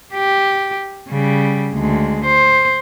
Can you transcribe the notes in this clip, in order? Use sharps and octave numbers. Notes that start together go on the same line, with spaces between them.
G4
C#3 G3
D2 G#3
C5